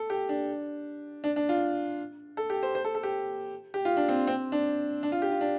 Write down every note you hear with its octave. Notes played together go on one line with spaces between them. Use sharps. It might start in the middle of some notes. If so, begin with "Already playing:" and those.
Already playing: A4
G4
D4
D4
D4
F4
A4
G4
C5
C5
A4
A4
G4
G4
F4
D4
C4
C4
D4
D4
F4
G4
F4
D4